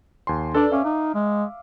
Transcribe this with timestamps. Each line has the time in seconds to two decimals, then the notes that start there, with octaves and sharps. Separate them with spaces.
0.27 D#2 G#5 C6
0.55 D4 A4 B4 D5
0.72 C#4 E5 F5 D6
0.85 D#4
1.14 G#3